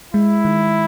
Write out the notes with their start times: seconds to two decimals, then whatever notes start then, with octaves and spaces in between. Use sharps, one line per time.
0.14 G#3 E4
0.45 D#3